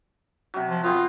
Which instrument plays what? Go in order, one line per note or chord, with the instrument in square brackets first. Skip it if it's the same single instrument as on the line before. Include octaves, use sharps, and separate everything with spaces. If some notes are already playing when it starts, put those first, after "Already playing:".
[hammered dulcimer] C3 F#3
[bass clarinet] F3
[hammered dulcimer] B3 C4 [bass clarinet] F4